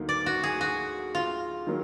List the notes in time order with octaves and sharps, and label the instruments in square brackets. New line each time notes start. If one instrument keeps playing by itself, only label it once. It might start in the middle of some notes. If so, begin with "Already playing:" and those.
Already playing: [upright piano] D2 D3 F#3 A#3 D#4
[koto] D5
F#4
G#4
F#4
F4
[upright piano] D#3 F#3 A#3